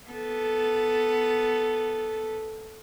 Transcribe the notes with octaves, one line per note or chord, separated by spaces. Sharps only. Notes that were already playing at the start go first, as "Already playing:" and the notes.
B3 A4